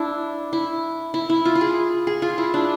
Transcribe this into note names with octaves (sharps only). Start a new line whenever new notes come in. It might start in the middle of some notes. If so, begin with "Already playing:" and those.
Already playing: D4 E4
E4
E4
E4
F4
F4
G#4
G#4
F4
E4
D4